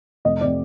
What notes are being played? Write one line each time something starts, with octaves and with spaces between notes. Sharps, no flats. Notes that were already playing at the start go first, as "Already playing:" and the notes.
F1 D#5
D5
C3